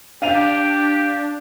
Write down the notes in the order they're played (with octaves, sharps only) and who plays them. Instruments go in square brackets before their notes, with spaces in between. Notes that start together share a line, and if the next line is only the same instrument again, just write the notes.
[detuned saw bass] D4 [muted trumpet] G4 [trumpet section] D5 G5 [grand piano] F5 D#7 F7